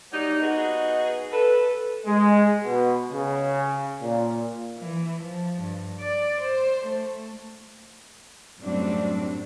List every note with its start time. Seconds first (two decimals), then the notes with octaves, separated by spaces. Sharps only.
0.12 F#3 G3 A#3 D#4
0.41 B3 D#4 F#4 G#4 B4 D#5
1.32 A4 B4
2.06 G#3
2.63 B2
3.11 C#3
4.01 A#2
4.78 E3
5.23 F3
5.61 G2
6.00 D5
6.41 C5
6.86 A3
8.61 F#2 A2 F#3 G3 C4 D4